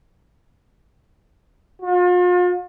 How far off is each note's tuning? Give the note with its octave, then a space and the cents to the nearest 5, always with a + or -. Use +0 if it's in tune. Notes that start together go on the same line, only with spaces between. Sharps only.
F4 +40